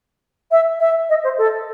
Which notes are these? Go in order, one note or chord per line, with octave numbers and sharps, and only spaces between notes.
E5
E5
D#5
C5
A4